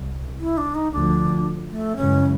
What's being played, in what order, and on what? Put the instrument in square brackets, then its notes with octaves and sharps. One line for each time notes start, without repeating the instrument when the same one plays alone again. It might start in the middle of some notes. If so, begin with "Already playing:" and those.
Already playing: [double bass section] C2
[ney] E4
D4
D#4
[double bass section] D2 D3 F3 [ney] D4
[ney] A3
[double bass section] F#2 C#3 E3 G#3 [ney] C#4